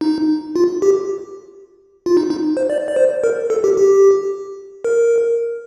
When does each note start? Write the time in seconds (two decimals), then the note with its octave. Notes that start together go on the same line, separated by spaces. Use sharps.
0.01 D#4
0.56 F4
0.82 G4
2.06 F4
2.17 D#4
2.30 D#4
2.57 C5
2.70 D5
2.88 D5
2.96 C5
3.24 A#4
3.50 A4
3.64 G4
3.77 G4
4.84 A#4